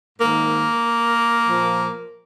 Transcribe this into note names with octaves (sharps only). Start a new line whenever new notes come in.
G#2 D#3 A#3
A#2 F3